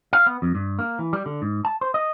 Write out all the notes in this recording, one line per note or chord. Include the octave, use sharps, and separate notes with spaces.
F5
B3
F2
G2
A#3
E3
G3
D3
G#2
A5
C5
D#5